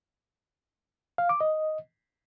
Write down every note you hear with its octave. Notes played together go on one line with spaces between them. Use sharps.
F5
D6
D#5